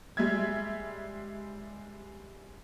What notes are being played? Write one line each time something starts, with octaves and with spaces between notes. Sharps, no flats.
G3 G#3 E5 G#6